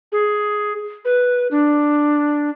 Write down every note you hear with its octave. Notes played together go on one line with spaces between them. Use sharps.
G#4
B4
D4